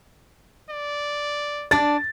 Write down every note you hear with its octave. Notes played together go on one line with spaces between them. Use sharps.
D5
D4 D5 A6